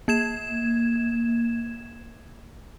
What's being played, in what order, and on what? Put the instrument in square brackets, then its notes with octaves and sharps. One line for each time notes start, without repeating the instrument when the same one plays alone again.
[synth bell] A#3 G#6 E7